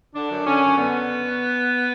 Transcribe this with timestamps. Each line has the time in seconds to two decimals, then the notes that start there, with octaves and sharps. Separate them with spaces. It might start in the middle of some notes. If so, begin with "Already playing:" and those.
0.15 D3 D4
0.31 F#2
0.47 D3 C#4
0.63 F#2
0.78 D3 B3